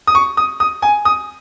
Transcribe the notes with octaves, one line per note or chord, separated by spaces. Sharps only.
D#6
C#6
D#6
D#6
G#5
D#6